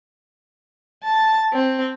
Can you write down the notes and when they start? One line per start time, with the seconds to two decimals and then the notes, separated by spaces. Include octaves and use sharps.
1.04 A5
1.53 C4